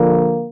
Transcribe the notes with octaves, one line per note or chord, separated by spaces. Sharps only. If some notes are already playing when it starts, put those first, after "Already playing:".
Already playing: D3 F3 A#3